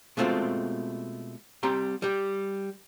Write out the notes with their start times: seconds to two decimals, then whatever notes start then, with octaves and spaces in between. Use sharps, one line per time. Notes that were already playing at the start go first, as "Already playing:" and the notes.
0.17 B2 G#3 A3 C4 F4
1.63 G3 C4 G4 A#5 C6
2.02 G3 G4